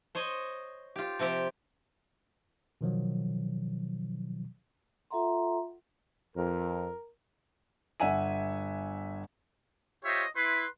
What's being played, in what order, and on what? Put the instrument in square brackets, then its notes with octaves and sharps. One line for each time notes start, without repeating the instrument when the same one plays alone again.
[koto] C5 C#5 D#5
F4 G4
C3 F3 C4 G4
[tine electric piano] B2 D#3 F3 F#3
[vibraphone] F4 A4 E5 F#5 A#5 C6
[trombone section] F2 [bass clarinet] A#4
[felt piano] G1 E5 F#5 G#5 D#7
[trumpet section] F4 G4 C5 C#5 D#5 E5
E4 B4 C6